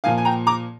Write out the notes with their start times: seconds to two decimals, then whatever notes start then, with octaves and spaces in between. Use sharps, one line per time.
0.04 A#2 F3 A#3 F5 G#5
0.18 G#5
0.25 G5 A#5
0.47 A#5 D6